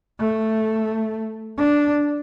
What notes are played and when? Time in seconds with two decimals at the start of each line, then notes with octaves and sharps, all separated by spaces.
0.20 A3
1.58 D4